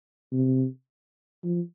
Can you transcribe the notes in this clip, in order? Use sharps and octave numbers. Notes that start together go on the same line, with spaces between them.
C3
F3